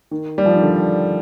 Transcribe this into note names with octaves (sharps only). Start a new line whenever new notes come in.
D#3
G3
F3
D#3
D3